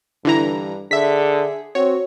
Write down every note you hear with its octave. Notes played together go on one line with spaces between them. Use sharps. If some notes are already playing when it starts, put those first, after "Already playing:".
G2 D3 E3 A#5
D3 G#4 E5 B6
C4 F#4 C#5